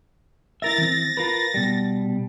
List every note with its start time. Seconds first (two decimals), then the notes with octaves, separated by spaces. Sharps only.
0.62 E4 A#4 E5 A6 A#6
0.78 E3 C4
1.17 F4 A#4 B4
1.54 B2 G3